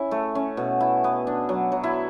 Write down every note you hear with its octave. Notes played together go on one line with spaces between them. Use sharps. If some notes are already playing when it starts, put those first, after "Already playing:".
Already playing: C#4 E4
A3
C#4
B2
E4
B3
D4
F#3
F#3
E4